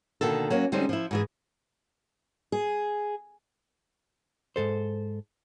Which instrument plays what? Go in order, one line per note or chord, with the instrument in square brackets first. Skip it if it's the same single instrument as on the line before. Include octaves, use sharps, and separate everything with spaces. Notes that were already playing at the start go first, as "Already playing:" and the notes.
[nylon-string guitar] B2 D3 D#3 A#3 A4
F#3 A#3 C#4
D3 G3 G#3 C4 C#4 D#4
F3 E4
G#2 E3 G#4
[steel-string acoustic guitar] G#4
[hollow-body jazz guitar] G#2 C3 A4 C5